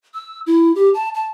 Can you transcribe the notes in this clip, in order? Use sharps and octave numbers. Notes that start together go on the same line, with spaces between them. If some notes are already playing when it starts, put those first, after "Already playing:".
E6
E4
G4
A5
A5